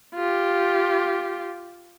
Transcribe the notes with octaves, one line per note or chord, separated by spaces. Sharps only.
F4 G4